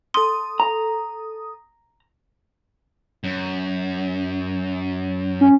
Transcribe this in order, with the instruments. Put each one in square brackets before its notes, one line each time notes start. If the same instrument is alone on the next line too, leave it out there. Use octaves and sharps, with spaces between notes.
[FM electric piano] A4 D#6 [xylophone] C6
[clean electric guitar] A#5
[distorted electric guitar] F#2
[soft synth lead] C#4